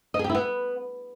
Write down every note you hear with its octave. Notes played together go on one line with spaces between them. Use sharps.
D#5
G#4
G4
E4
B3